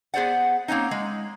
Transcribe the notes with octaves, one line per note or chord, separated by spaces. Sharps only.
B3 G#4 C5 D5 F#5
A#3 C4 C#4 D#4
G#3